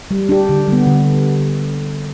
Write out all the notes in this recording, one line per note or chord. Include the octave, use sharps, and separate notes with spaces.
G3
D4 G4
D3
G3 B3
D3